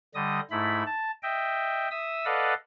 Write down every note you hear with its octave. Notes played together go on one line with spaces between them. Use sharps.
D3 G3 D#5 D#6
G#2 A3 E4 B5
A5
D#5 E5 G5
E5 D#6 E6
A4 B4 D5 D#5 F5 F#5